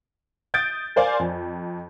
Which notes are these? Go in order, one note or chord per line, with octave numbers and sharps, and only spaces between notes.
D#6 G6 A6 D7
A#4 C5 D5 F5 G#5 C6
F2